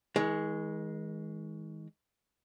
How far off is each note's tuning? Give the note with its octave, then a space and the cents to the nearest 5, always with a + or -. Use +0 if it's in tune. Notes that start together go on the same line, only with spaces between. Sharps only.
D#3 +45 G#3 +0